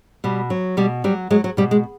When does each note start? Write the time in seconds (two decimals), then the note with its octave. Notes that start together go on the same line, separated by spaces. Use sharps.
0.24 B2 G3
0.50 F#3
0.77 B2 G3
1.04 F#3 G3
1.30 F#3 G#3
1.44 F#3
1.57 B2 G3
1.71 G#3